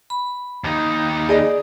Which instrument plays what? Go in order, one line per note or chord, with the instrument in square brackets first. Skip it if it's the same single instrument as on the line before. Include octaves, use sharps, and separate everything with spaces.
[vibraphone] B5
[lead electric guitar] D#2 D#4
[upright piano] G#4 D#5 [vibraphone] D5